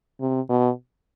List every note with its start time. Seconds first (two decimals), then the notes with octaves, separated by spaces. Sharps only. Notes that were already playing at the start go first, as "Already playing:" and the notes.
0.21 C3
0.49 B2